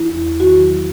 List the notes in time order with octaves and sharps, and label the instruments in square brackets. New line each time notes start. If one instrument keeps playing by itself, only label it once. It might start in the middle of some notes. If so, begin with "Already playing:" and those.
Already playing: [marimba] E3 E4
E2
E2
D#3 F#4
F#3